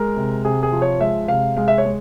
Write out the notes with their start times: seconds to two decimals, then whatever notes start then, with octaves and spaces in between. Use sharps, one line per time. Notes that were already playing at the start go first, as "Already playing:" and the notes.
Already playing: G#3 A#4
0.16 C3
0.45 C3 G#4
0.63 G#4
0.72 F3
0.82 C#5
1.00 G#3 E5
1.28 C3 F5
1.57 G#3 F5
1.68 E5
1.78 C#5
1.85 G#3